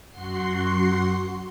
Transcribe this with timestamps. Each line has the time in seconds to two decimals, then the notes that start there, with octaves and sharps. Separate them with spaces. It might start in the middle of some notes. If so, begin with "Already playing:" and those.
0.11 F#2 F#4 F#5 C6 C7